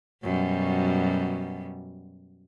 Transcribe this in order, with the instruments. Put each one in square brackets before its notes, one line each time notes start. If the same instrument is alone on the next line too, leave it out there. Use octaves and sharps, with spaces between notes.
[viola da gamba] F#2 B2 G3